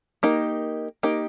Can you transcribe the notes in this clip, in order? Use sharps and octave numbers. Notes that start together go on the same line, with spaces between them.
A#3 D#4 G4
A#3 D#4 G4